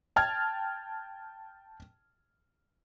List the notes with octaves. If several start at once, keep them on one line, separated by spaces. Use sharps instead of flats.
G5 A5 F6 G#6